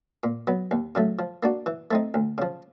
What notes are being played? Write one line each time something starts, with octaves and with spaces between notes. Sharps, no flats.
A#2
F#3 B3
D#2
C#3 F#3 A3
F3
A#3 D4 F#4
E3
A3 C4 D#4
D2
C#3 F3